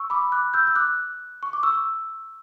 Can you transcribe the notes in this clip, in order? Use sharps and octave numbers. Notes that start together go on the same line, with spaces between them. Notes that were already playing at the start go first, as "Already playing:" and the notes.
Already playing: C#6 E6
B5 D6
D6 F#6
E6 G6
E6
D6 F#6
C#6
D6
C#6 E6